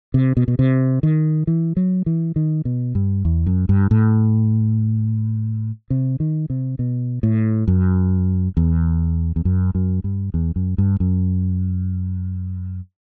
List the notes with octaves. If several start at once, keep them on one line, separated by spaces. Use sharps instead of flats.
C3
B2
B2
C3
D#3
E3
F#3
E3
D#3
B2
G2
E2
F#2
G2
A2
C3
D#3
C3
B2
A2
F#2
E2
E2
F#2
F#2
G2
E2
F#2
G2
F#2